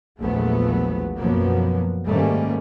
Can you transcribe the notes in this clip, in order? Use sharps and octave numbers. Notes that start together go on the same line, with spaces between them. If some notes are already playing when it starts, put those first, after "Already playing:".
A#1 E2 F3 F#3 A3 B3
F#2 B2 F3 F#3 A#3 B3
G#2 D#3 G3 A3 A#3 C#4